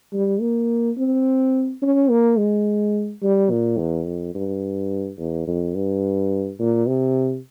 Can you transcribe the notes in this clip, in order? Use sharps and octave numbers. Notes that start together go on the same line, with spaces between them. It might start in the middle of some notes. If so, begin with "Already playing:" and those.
G3
A#3
C4
C#4
A#3
G#3
G3
A#2
E2
F2
G2
E2
F2
G2
A#2
C3